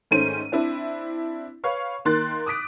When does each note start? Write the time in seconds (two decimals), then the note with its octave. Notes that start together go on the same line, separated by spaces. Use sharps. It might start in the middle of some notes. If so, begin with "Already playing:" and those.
0.11 G#2 D#3 A3 C#4 C5 D#7
0.52 C4 D4 E4
1.64 B4 C#5 F5 C#6
2.05 D#3 A#3 C6 F#6 A6
2.46 D6 D#6 F#6 B6 D7